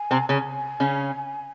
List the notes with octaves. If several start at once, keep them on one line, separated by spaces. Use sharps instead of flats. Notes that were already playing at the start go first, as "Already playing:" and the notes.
Already playing: G#5
C3 C4
C#3 C#4 G#5
C#3 C#4